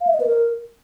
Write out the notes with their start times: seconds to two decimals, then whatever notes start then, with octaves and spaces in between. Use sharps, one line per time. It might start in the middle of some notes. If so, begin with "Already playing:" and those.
0.01 F5
0.07 E5
0.14 D#5
0.20 B4
0.27 A#4